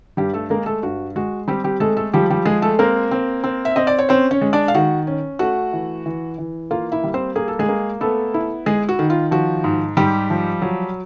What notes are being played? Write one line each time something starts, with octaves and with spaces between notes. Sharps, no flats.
G2 G3 G4
A3 A4
G#3 A#3 A#4
A3 A4
G2 F#4
G#3 F#4
G3 C4 G4
G3 G4
G#3 A3 A4
A3 A4
F3 G3 G4
G3 G4
G#3 G#4
A3 A4
A#3 C4 A#4
C4
C4
E5
C4 D#5
D5
C#5
C4 C#4 C5
C#4 C#5
G#3
D4 D5
F5
D#3 F#4 F#5
C#4
A3 F#4 F#5
E3
E3
E3
A#3 F4 F5
E4 E5
G3
C4 C5
A#3 G#4
A4
G#3 G#4
A#3
A3 B3 A4
E4
G#3 G#4
F#4
D#3
F4
F3 F#4
G#2
G#2 G3 G4
F3
F#3